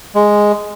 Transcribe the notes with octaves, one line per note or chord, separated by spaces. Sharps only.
G#3